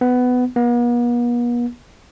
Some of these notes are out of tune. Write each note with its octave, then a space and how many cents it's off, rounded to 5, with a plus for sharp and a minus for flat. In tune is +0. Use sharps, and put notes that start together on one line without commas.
B3 +15
B3 -45